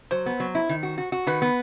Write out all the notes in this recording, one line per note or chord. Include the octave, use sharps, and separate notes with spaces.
F#3 C5
B3
F#3
E4
D#3
F#4
F#4
F#4
D#3 B4
B3